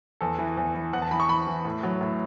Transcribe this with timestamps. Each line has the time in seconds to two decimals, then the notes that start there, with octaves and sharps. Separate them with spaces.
0.21 E2 A4
0.38 E3
0.57 E2
0.75 E3
0.93 E2 F#5
1.02 A5
1.11 E3 B5
1.20 C#6
1.29 E2 B5
1.47 E3
1.65 A2
1.83 F#3
2.01 A2